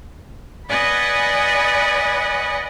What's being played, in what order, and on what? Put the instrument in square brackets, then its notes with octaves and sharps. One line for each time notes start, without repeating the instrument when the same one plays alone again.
[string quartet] B4 D5 D#5 F#5 G#5 B5